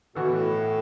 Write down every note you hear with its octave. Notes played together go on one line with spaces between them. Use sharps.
B2 E3 B3 F#4 A4
A2